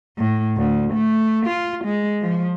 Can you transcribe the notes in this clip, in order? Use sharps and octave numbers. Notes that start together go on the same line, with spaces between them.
A2
D2
A3
F4
G#3
F3